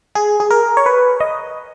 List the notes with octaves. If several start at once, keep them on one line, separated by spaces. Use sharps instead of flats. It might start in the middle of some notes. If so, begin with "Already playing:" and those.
G#4
G#4
A#4
C#5
B4
D#5